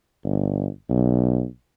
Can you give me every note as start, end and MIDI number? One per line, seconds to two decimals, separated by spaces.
0.24 0.67 31
0.89 1.45 35